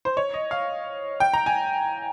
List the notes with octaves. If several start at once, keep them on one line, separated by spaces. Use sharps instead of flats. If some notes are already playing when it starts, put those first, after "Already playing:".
C5
C#5
D#5
F5
G5
A#5
G#5